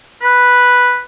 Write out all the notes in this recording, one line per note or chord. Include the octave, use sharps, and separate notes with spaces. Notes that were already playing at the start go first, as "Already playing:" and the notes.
B4